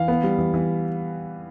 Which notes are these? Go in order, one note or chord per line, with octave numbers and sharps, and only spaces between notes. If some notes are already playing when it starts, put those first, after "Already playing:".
Already playing: E3 F5
B3
G3
E3
E3